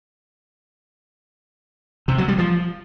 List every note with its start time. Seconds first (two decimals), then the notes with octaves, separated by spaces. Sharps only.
2.08 C3
2.18 F#3
2.28 G3
2.38 F3